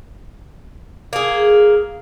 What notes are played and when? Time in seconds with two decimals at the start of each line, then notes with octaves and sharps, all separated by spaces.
1.13 A#3 G#4